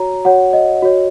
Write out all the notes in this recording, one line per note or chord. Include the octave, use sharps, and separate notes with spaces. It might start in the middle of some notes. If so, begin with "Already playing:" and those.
Already playing: F#4 C#5 A#5
F#4 C#5 F#5
D#5
F#4 C#5